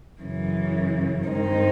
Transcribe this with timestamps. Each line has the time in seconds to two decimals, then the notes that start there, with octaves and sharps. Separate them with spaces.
0.21 F#2 C#3 E3
1.29 G2 D#3 G#3 C4 D#4